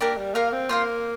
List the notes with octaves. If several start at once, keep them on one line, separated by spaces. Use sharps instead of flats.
A#3 D4 G4 A#4
G3
A#3 F4 A#4 F5
C4
A#3 F4 C5 F5